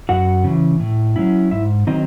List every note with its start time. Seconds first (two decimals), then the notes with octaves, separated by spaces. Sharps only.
0.09 F#2 F#4 F#5
0.44 C#3 E3
0.80 A2
1.16 F#3 C#4 E4
1.51 G#2 E4 E5
1.87 D#3 F#3 C4 D#4 D#5